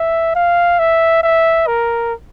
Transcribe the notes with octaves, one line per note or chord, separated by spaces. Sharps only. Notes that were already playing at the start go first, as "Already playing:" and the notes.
Already playing: E5
F5
E5
E5
A#4